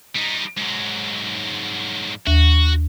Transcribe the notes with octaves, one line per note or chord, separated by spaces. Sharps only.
G3 D#4
G#2 F#3
D#2 F#4